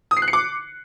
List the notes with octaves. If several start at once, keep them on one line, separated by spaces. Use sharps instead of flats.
D#6
C7
F#6
C#7
D6